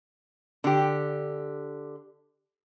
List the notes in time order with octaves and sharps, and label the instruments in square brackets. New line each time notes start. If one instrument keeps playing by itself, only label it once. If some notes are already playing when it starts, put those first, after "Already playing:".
[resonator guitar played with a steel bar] D3 G4